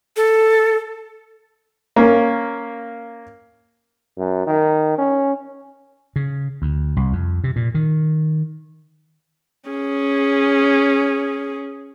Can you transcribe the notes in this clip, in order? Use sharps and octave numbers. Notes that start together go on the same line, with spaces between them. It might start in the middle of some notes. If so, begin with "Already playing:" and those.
A4
A#3 C#4
F#2
D#3
C#4
C#3
D2
C2
F2
C3
A#2
D#3
C#4 G#4